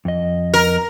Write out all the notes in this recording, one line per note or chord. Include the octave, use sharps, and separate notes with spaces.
F2 D#5
A#4